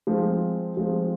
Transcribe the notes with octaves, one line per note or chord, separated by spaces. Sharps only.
F3 G#3 C4
F3 G#3 C4